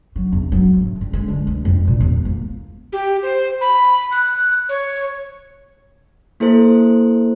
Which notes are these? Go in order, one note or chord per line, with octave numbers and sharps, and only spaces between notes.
F#3
E2
F#3
A2
G2
G#3
D3
D2
F2
A#2
E2
A#3
G4
C5
B5
F#6
C#5
A#3 E4 A4 C5